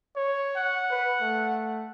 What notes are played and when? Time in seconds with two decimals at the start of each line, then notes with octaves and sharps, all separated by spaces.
0.16 C#5
0.56 F#5
0.91 B4
1.21 A3